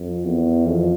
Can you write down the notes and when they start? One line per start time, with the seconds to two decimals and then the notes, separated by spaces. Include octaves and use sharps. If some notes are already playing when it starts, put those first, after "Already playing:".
Already playing: F2
0.25 E2
0.65 F2